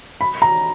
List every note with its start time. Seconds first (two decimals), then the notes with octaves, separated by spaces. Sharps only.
0.21 B5
0.42 A#5